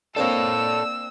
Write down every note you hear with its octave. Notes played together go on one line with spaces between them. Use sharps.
A#3 C4 D4 A4 C#5 E6